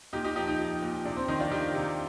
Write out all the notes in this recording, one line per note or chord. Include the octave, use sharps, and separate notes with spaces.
A#2 D#4 G4
D#4 G4
F3 D#4 G4
D#4 G4
F3
A#2
C3 D4
C4
D#3 C4 D#4
D4 F4
D#3 D#4 G4
C3